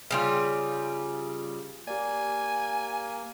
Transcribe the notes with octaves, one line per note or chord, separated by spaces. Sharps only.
C#3 G3 F4
A#3 G4 D5 G#5